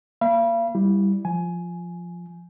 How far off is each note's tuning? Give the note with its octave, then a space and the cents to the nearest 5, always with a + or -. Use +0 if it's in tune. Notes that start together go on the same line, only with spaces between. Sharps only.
A#3 +0 F5 -40 B5 -30
G3 +0 E4 +0
F3 +0 G#5 +15